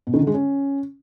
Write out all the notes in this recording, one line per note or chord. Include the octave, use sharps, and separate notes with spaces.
B2
D#3
D3
G#3
C#4